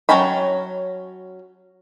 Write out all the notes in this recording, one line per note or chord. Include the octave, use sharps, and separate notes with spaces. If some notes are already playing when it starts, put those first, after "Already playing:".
F#3 C#4 G5 A5 B5